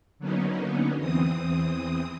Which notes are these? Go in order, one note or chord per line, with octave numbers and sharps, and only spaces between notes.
D3 F#3 A#3 B3 C#4 D#4
E2 E3 C4 D#6